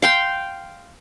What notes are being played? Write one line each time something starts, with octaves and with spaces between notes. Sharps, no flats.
F5 G5 C6